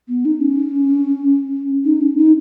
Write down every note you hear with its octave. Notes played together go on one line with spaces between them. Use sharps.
B3
D#4
C#4
D#4
C#4
D#4